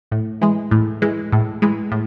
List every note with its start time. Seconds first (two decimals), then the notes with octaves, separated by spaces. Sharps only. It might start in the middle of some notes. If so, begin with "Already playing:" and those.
0.12 A2
0.41 E3 G#3
0.71 A2
1.02 E3 G#3
1.32 A2
1.62 E3 G#3
1.92 A2